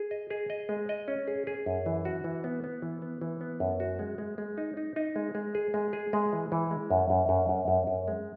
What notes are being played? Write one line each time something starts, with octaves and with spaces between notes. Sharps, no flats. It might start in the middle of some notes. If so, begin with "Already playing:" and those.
Already playing: G#4
D#5
G#4
D#5
G#3
D#5
C#4
G#4
G#4
F#2
E3
F#4
E3
B3
B3
E3
B3
E3
B3
F#2
F#4
G#3
G#3
G#3
D#4
D#4
D#4
G#3
G#3
G#4
G#3
G#4
G#3
E3
E3
G#3
F#2
F#2
F#2
F#2
F#2
F#2
G#3